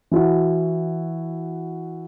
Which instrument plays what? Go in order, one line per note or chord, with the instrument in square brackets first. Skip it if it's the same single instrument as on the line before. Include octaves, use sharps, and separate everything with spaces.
[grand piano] E3 E4 F#4